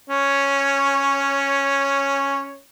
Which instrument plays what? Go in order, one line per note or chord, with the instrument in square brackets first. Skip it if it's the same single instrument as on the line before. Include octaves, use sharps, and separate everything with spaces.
[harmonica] C#4 C#5